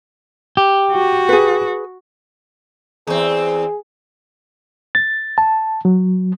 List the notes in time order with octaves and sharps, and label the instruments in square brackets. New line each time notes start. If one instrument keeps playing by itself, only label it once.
[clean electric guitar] G4
[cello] F#4
[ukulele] G#4 B4
[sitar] E2 C4 [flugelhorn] G#4
[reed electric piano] A6
A5
F#3